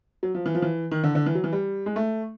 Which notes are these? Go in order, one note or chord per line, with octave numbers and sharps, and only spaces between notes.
F#3
F3
E3
F3
E3
D#3
D3
D3
E3
F#3
E3
G3
G#3
A3